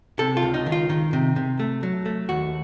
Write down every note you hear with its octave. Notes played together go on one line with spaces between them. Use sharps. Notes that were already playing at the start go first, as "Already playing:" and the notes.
C3 A4
F4
C#2
D#4
D#3
F4
D#3
C3
C3
A3
F#3
A3
D#2 F#4